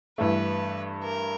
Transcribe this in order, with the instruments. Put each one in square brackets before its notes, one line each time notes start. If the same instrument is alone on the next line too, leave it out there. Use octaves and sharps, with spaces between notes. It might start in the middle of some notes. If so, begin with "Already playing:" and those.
[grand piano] G2 E3 A3 [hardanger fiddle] B4
[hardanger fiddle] A#4